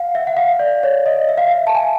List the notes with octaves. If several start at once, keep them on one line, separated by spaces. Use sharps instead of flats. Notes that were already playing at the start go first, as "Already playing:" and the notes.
Already playing: F5 F#5
E5
F#5
F5
D5
C#5
D#5
E5
F5
E5
A5
G#5